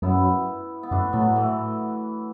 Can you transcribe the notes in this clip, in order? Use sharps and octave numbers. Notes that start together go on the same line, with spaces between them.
F#2 B3 E4
B3
F#2 A3 D4
A2 F#3 B3
E3 A3